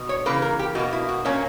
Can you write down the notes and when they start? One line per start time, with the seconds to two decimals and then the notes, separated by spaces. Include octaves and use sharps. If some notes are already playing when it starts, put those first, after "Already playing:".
Already playing: B2
0.09 C#5
0.26 C#3 E3 A#3 B4
0.42 A#4
0.59 G4
0.75 B2 A#3 F#4
0.93 E4
1.09 F#4
1.25 A#2 A#3 C#4